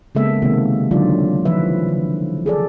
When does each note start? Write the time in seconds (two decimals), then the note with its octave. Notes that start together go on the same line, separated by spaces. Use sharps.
0.15 C#3 G#3 A#3 B3 A4 E5
0.42 C3 D#3 G#3 A#3 C4 F#4
0.91 D3 D#3 F#3 D#4 F4 D5
1.45 E3 F3 B4 E5
1.88 D3
2.46 G#4 A4 D5